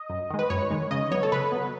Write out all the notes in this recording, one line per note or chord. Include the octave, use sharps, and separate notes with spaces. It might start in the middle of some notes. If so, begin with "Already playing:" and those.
Already playing: D#5
F#2
D#3 G#3
B4
F#2 C#5
D#3 G#3
C#3 D#5
F#3 B3 C#5
A4
C#3 B4
F#3 B3